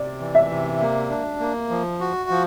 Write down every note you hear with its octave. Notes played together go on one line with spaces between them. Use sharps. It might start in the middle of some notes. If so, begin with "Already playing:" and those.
Already playing: C3 D5
E3
E5
C3
A#3
D4
A#3
F3
F#4
F3